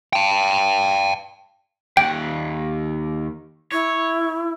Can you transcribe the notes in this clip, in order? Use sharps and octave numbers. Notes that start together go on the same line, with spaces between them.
G5 A5
D#2 F#5 G5
E4 C#5